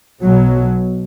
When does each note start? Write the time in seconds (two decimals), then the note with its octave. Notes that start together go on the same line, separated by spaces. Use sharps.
0.21 B1 B2 F#3